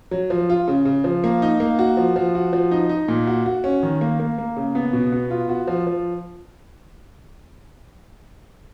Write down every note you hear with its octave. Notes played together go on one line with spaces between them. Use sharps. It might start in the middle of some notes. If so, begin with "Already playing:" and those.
F#3
F3
F4
C#3
C#3
F3
A#3
D#4
A#3
F#4
F3
F3
F#4
F3
D#4
D#4
A#2
F#4
F#4
C#4
D#3
A#3
A#3
A#3
C#3
B3
B2
B3
F4
F#4
F3
F3